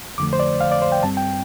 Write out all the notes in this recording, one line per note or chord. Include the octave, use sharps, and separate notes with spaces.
F2 D3 F3 A3 D6
C5
D5
F5
D5
C5
G5
G2 G3 C4 A5
G5